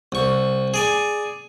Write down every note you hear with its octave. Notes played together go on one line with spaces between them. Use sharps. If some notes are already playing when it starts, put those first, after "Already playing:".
C2 C#6
G#4 D5 G#5